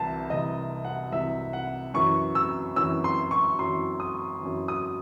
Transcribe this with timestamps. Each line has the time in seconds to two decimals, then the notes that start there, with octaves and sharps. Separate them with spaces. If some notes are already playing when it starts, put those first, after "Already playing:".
Already playing: C2 C3 E3 A5
0.30 C2 C3 E3 D#5
0.85 F#5
1.12 C2 C3 E3 E5
1.53 F#5
1.94 F#2 E3 C#6
2.35 E6
2.76 F#2 E3 E6
3.04 C6
3.31 C#6
3.58 F#2 E3 C6
4.00 D#6
4.41 F#2 E3
4.68 D#6